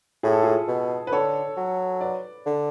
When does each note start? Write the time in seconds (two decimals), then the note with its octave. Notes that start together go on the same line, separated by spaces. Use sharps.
0.23 A2 G#4
0.33 A4
0.43 F4 G#4
0.68 B2
1.07 B4
1.12 D3 A4 C#5
1.57 F#3
2.01 B4 D5
2.46 D3